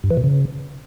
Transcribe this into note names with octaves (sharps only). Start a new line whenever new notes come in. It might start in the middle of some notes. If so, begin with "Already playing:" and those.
G2
E3
B2
C#3